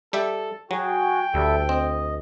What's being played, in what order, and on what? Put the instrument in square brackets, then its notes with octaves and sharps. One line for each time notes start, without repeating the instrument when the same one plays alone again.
[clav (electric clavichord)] G3 G4 E5 [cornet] A4
[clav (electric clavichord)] F#3 [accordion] F#4 G#4 [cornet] G5
[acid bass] D2 [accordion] G3 A4 E5
[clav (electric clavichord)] C4 [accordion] D#5